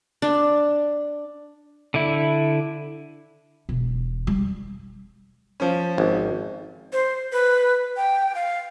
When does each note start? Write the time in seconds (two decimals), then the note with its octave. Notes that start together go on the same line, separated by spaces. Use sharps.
0.22 D4
1.94 D3 E4
3.69 E1
4.27 G3
5.60 F3 C#4
5.98 G#1
6.93 C5
7.32 B4
7.97 G5
8.35 F5